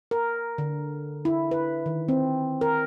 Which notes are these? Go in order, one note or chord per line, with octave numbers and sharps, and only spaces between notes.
A#4
D3
E4
B4
D#3
C4
A#4